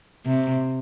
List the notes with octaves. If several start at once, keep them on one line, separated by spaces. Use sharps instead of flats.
C3